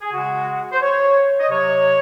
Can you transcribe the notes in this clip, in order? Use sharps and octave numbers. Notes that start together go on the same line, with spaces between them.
G#4
C#3 G#3 F#4
C5
C#5
D#5
C3 F#3 C#5